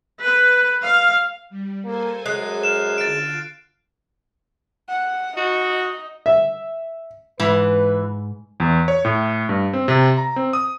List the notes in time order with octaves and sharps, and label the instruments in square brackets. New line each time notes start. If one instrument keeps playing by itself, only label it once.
[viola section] B4
F5
[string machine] G3
[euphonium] A#3 [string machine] A4 C5 G#5
[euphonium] F#2 [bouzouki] G#3 [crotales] F#6 C7
[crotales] F6 E7
[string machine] D3 F4 [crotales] A6 D7
[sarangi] F#5
[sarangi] D#4 [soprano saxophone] F#4
[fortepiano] E5
[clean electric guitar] G#2 [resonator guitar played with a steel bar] E3 [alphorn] B4
[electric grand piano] E2
C#5
A2
G2
C4
C3
A#5
C4
D#6